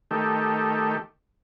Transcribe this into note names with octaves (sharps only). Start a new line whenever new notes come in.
D#3 A3 G4